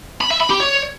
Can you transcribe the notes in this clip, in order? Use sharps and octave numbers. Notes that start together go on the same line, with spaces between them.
B5
E5
B5
G4
C#5